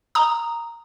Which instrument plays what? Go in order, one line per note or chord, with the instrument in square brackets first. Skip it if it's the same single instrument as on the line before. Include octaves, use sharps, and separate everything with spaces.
[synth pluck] A#5 D#6